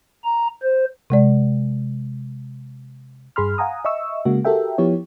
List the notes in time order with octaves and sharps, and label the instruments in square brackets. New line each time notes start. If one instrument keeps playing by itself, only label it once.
[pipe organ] A#5
C5
[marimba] C3 G#3 D5
[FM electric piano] G2 G#4 B5 C6 F6
F5 F#5 G#5 A#5 D#6
D#5 E5 C#6 E6
C#3 G#3 A#3 F#4
F#4 G4 A4 A#4 E5 G5
F3 B3 E4 G4 C#5